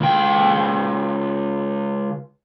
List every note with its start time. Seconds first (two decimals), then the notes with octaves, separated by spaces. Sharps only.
0.01 C#2 G5